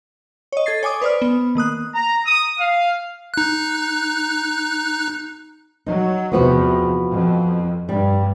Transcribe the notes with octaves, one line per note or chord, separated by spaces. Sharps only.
C#5 D#5
A4 G#6 A6 C7
C#5 G#5 D6 D#6
B4 C5 D5 D#6 F6
B3
D#3 A#3 D#6 F#6
A#5
D#6
F5
D#4 F#6
F#3 D#4
E2 C3 F3 B3 F#4
F2
G2 G3